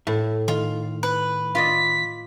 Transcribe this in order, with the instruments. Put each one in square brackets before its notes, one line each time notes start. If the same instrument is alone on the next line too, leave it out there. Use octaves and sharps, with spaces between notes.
[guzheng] A2 [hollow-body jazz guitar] E5
[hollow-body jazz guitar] D#3 [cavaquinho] F4
[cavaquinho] B4
[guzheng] F4 D5 D#5 [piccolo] B6